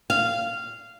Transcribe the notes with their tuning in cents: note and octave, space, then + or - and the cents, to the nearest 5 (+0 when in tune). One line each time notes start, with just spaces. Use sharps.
F5 -15